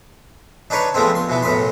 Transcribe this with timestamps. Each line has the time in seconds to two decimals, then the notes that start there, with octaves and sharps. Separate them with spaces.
0.70 D4 D#4 B4 C#5
0.94 F3 G#3 A3 B3 C4
1.15 C6
1.29 B2 E3 B3
1.43 F#2 A2 B3 B5 C6